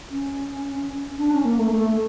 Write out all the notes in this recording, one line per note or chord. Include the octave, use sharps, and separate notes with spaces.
C#4
D4
C#4
A#3
A3
A3